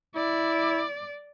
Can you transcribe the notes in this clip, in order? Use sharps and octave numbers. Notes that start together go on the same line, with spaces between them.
E4 D5